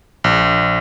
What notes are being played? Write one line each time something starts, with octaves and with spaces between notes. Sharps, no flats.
A#1